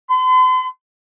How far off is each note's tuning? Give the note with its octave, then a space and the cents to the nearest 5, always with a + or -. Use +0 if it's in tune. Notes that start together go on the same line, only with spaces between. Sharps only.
C6 -45